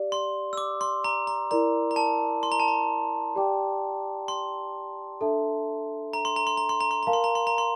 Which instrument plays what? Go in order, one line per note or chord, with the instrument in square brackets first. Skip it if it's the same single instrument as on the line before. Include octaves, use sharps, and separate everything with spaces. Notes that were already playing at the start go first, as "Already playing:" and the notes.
Already playing: [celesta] G4 D5 F5
[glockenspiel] C6
E6
D6
C6
A#5
A#5
[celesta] E4 A#4 D5 [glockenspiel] A#5
[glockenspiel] A#5
A5
C6
A#5
A5
A#5
[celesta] G4 D5 G5 D6
[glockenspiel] C6
[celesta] D4 A4 E5 A5
[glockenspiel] A#5
C6
A#5
C6
A#5
C6
A#5
C6
[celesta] A#4 F5 A5 [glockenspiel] A#5
[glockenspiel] C6
A#5
C6
A#5
C6